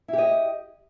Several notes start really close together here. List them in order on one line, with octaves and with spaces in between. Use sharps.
E4 G4 D#5